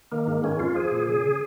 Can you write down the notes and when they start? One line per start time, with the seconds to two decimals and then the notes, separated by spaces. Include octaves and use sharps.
0.12 D#3 A#3
0.27 G#2
0.44 D#3 C#4
0.59 F2 F4
0.75 F3 G#4
0.91 A#2
1.07 C#3 G#4